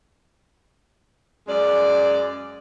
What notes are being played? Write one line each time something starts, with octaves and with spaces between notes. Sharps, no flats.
F#2 G#3 D5